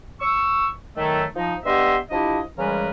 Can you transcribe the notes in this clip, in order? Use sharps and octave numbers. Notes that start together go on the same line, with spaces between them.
C#6 E6
D#3 F#3 A3
F3 D#4
G2 B3 G4 D#5 E5 C6
F3 D4 E4 G4 D#5
C#3 E3 G3 G#3 A#4 B4